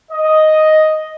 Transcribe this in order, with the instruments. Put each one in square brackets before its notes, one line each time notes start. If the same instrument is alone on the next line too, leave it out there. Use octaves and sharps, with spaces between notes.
[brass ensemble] D#5